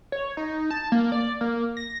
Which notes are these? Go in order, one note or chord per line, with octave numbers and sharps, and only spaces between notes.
C#5
D#4
A5
A#3
D5
A#3
A#6